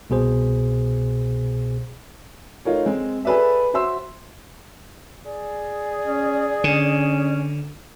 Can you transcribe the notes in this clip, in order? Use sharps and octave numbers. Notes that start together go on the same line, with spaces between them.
C2 B2 G#4 C5
A3 D#4 F4 A#4 C#5
G#3 C4
G#4 A4 B4 D5 E5
F#4 C5 E5 C6 E6
G#4 D5
C#4
D3 C#4